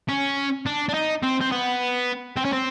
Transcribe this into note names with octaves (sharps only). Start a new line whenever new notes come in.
C#4
D4
D4
D#4
C4
C4
B3
C4
C#4
C4